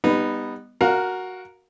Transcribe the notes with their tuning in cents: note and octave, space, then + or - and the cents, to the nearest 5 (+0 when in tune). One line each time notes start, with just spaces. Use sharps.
G3 +25 B3 +0 D#4 -15
F#4 +0 A#4 +0 F5 +20